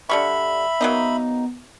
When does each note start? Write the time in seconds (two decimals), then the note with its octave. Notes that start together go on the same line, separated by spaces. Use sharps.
0.09 D3 G3 E5 B5 C#6
0.81 F#3 A#3 B3 D#4